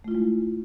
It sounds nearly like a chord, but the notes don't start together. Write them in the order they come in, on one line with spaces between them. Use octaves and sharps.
A3 F4 E4 G#3